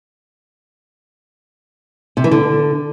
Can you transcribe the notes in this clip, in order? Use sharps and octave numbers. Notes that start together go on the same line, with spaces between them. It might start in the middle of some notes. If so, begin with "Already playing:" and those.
C3
E3
D3